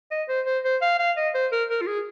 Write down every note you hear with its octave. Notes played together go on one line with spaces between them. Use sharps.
D#5
C5
C5
C5
F5
F5
D#5
C5
A#4
A#4
F4
G#4